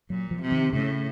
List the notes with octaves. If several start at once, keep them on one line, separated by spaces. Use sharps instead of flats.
A#2 F#3
F3
C3
D#3
A2 C#3